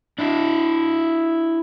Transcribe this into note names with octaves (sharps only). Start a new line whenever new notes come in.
D4 E4